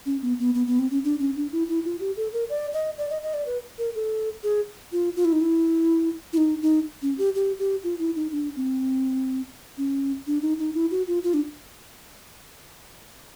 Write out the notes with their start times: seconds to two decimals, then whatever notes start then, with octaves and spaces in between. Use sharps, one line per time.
0.06 C#4
0.22 B3
0.39 B3
0.54 B3
0.67 B3
0.79 C4
0.91 C#4
1.04 D4
1.19 C#4
1.36 D4
1.52 E4
1.68 E4
1.85 F4
2.00 G4
2.17 A4
2.33 A#4
2.49 D5
2.73 D#5
2.98 D5
3.10 D#5
3.22 D#5
3.34 D5
3.46 B4
3.78 A#4
3.95 A4
4.43 G#4
4.92 F4
5.16 F4
5.25 E4
5.32 D#4
5.41 E4
6.33 E4
6.37 D#4
6.62 D#4
7.02 C#4
7.18 G4
7.35 G4
7.59 G4
7.84 F4
7.99 E4
8.16 D#4
8.32 D4
8.56 C4
9.78 C#4
10.27 D4
10.42 D#4
10.59 D#4
10.74 E4
10.91 F#4
11.08 F4
11.23 F4
11.34 D4